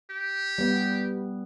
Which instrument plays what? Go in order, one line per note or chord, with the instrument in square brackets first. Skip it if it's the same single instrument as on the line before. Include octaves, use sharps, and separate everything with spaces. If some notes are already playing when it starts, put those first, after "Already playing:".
[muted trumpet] G4
[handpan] G3 B3